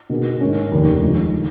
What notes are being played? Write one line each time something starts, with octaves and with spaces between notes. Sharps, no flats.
B2 A#3 D#4 G#4
G#1 G#2 D#3 G#3 C#4
F1 D#2 D#3
C#3 F3 G#3
D#3